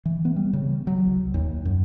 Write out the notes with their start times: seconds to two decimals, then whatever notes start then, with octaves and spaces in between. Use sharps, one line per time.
0.06 E3
0.25 B3
0.36 G3
0.53 C#3
0.87 F#3
1.06 C2
1.34 D#2
1.65 F#2